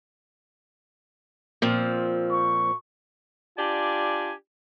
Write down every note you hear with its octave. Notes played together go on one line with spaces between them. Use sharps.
A#2 F3 C4
C#6
D4 F4 G4 D5 G#5